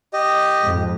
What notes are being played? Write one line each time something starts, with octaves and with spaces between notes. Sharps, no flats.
G4 D#5
F2 G#2